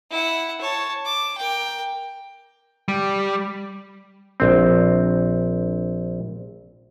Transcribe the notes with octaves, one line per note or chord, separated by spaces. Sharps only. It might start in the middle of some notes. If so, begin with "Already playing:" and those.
E4 F#5
C#5 A5
D6
A#4 G5
G3
A#1 C4